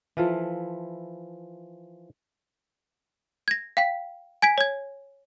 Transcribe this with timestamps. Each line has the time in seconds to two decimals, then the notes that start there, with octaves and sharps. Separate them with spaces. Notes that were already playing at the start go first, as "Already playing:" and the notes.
0.17 E3 F3 E4 F4 A4
3.48 G#6 A#6
3.77 F5 G5 B6
4.42 G#5 G#6 B6 D7
4.58 C#5 G#6